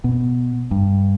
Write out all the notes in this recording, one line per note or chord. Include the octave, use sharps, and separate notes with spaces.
B2
G2